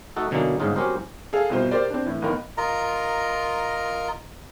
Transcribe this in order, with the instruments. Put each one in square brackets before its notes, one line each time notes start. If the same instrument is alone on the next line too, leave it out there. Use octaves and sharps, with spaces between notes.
[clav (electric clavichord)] A3 D#4 F#4 A4
B2 D3 E3 F#3 A#3 D#4
G1 G#2 C#3 D#4 F4
F#3 C4 C#4 G4 A#4 C5
[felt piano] G#4 A4 F5
C2 B2 F4 C5
G4 A#4 C5 D5
C4 D4
A2 E3
D#2 B3 D#4 A#4
[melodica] F4 A#4 D#5 A#5